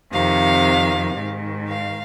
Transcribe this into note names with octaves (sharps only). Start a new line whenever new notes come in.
F2 C3 D#3 F5
G#2 D#3
F5